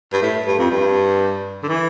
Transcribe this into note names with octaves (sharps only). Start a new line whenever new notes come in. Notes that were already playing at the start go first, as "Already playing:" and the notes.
G2
A2
G2
F2
G2
D3
E3